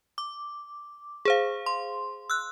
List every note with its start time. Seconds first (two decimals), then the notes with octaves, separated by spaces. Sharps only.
0.18 D6
1.25 G#4 C5 F5
1.66 C6
2.30 E6 F#6